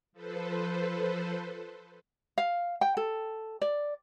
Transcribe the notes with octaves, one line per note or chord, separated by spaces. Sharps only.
F3 A4 B4 C5
F5
G5
A4
D5